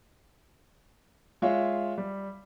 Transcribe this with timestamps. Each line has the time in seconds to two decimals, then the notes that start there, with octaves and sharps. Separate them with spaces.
1.42 G#3 F4 C#5 E5 F5
1.98 G3